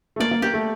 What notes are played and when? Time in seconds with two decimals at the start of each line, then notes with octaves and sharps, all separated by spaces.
0.16 A3
0.20 A#3 D5
0.31 A#3
0.42 A#3 G4
0.54 A3